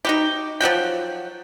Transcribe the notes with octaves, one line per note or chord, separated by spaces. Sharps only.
D#4 F#4 G4
F3 F#3 F#4 G5